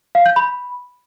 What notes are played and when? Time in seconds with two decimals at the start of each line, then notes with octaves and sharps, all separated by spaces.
0.15 F5
0.26 G6
0.36 B5